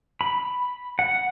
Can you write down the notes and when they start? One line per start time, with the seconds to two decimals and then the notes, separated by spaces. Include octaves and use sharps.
0.21 B5
0.99 F#5